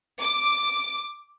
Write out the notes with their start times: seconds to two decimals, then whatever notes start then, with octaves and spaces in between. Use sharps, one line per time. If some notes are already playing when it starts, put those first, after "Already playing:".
0.21 D6